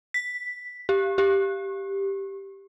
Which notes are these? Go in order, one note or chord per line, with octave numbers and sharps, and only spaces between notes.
B6
G4
G4